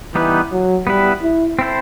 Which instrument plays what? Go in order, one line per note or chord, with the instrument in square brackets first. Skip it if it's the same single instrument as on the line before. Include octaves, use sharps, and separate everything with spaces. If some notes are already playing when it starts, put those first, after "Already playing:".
[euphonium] E3 [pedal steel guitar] G3 B3 D#4 G4 B4
[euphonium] F#3
[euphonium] G3 [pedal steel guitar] B3 E4 B4
[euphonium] E4
[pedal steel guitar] C4 E4 A4 C5